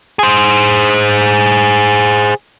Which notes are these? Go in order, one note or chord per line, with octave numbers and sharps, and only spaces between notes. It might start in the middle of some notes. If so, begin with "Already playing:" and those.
G#4 C5